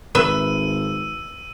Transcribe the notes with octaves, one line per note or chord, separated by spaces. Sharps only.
G#1 B4 E5 E6 D#7